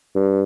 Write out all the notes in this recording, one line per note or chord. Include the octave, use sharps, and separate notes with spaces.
G2